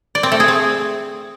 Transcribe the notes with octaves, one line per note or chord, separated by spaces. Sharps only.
D5
C4
A3
G#4
C4